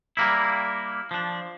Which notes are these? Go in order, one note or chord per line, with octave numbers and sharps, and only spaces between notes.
G3 A#3 E4
F3 D4